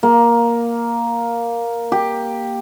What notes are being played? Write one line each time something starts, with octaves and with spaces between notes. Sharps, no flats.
A#3
G4